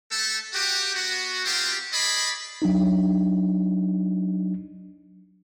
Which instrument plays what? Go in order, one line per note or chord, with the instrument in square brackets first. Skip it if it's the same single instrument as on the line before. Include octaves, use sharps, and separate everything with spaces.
[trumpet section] A3 A4
F#4 G4
B3 F#4
B3 C4 F4 G4
G#4 D5 D#5 B5
[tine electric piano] F#3 D4 D#4